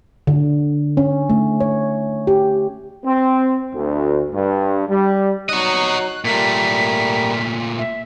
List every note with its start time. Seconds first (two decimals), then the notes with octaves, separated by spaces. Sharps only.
0.27 D3
0.97 C#4
1.30 A3
1.60 C#5
2.27 G4
3.03 C4
3.73 D2
4.32 G2
4.88 G3
5.49 F#3 D#4 F#4 D#5 F#6
6.25 A#2 G3 A3 A#4 B6
7.78 E5